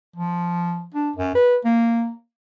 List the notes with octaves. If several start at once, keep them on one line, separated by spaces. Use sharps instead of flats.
F3
D4
F#2
B4
A#3